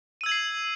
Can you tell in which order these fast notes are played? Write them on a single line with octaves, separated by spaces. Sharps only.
D#7 E6 G#6 F#7 C7